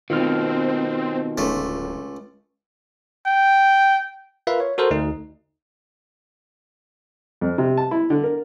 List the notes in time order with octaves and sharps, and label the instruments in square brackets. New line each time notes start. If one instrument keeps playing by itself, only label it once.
[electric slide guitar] B2 D#3 [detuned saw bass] C4 [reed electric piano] F4 F6
[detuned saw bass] D1 [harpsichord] C#2 A3
[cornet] G5
[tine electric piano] F4 A#4 B4 E5 F5
C#5
F#4 A4 A#4 C5
D2 D#4
[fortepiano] F2
C3
A5
E4
D3
A#4